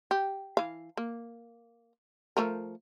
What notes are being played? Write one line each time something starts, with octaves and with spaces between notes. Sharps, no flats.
G4
E3 F5
A#3
F3 A3 A#4